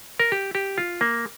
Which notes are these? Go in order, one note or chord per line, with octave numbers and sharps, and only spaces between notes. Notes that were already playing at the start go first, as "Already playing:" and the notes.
A#4
G4
G4
F4
A#3